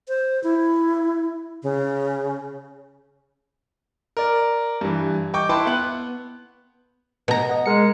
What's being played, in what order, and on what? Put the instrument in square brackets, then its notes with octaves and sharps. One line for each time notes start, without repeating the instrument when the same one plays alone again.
[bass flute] C5
E4
C#3
[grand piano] A#4 D5
G2 E3
D#5 G5 C#6 D6 G6
E4 B4 G5 A5 B5 C6
B3 F#6
[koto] B2 A#5
[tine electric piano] D#5 F#5
[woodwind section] G#3 [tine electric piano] A#4 C#7